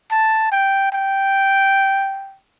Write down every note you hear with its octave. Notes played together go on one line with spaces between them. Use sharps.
A5
G5
G5